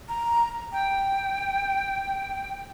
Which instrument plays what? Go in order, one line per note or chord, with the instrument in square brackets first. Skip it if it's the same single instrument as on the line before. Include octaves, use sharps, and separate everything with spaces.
[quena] A#5
G5